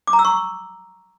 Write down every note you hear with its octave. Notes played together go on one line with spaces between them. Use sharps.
D6
A#5
E6
C#6